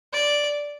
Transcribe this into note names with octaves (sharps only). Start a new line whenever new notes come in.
D5